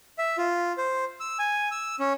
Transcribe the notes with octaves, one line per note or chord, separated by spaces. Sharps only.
E5
F4
C5
E6
G#5
E6
C#4